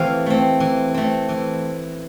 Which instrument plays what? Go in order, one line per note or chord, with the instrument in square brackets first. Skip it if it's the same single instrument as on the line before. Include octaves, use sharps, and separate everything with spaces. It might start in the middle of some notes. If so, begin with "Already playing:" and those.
Already playing: [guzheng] E3 A3 C4 G4 F5
A3 C4
E3
A3 C4
E3